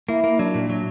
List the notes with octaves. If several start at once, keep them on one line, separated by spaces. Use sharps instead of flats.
A#3 E4
A#3
F#3 D4
A#2
F#3